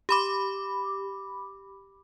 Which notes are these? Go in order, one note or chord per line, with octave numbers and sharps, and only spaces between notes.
G4 B5 D6